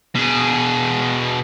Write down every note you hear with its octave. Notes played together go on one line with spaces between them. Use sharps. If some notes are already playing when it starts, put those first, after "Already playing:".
B2 G#4